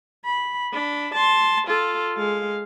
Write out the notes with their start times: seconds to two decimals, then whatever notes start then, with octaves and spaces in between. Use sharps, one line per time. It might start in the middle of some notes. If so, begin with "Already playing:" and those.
0.25 B5
0.73 D4 B5
1.14 A5 C6
1.67 F4 A4
2.16 G#3 F5